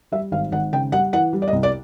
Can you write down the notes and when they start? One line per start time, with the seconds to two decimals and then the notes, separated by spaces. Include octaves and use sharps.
0.12 G3 E5
0.32 G#1 F5
0.52 G#1 F#5
0.73 C#3 G5
0.92 G3 F#5
1.13 E3 F#5
1.33 G3
1.42 D5
1.48 D#5
1.52 C2
1.63 D5